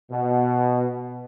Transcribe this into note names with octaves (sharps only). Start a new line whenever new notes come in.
B2